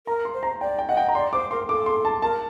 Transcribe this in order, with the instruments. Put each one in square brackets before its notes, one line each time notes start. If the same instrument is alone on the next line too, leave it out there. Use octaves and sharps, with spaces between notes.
[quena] A#4 [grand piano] A#5
[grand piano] C6
[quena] C5
[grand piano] A#5
[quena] D5 [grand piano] G5
[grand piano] G5
[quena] D#5 [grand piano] F#5
[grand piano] G5
A#5
[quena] D5 [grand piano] C6
[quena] C5 [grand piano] D6
[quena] A#4 [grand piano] C6
[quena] A4 [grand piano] D6
[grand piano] C6
A5
[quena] A#4 [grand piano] A5